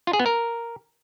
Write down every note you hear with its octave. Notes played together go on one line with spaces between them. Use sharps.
F4
G#4
B3
A#4